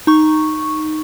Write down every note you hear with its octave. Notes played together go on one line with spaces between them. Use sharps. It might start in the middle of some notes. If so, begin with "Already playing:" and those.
D#4 C#6